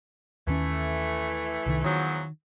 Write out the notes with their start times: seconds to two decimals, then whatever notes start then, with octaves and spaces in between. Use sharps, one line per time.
0.47 D#2 D#3 E3 A3 C#4
1.66 C2 D#3
1.84 E2 D#3 F3 F#3